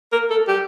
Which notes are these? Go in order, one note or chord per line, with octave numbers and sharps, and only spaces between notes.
A#4
A4
G4